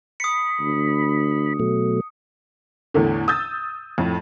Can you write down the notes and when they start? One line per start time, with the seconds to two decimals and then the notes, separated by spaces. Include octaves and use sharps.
0.20 B5 D#6 C#7
0.60 D2
1.59 B2 F#3 A3
2.94 E2 A2 D3
3.28 D#6 E6 G6 A6
3.98 F2 A2